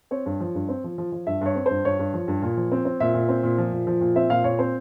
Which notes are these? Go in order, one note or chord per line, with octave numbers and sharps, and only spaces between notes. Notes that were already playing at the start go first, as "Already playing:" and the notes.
C4 C#5
G2
F3
G2
C4
F3
F3
F3
G2 E5
G2 C#5
C4
G2 C5
G2 C#5
G2
F3
G2
A#2
F3
C4
C4
A#2 E5
A#2
C4
A#2
F3
A#2
F3
A#2
C4 E5
A#2 F5
A#2 C#5
C4 C5